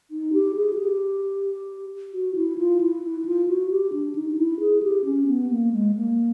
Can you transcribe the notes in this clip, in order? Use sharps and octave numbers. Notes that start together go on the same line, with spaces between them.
D#4
G4
G#4
F#4
G4
F#4
E4
F4
E4
E4
E4
F4
F#4
G4
D4
D#4
D#4
E4
G#4
G4
C#4
B3
A#3
G#3
A#3